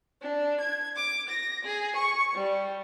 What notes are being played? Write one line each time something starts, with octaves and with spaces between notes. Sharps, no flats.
D4
G#6
D6
A#6
G#4
C#6
G3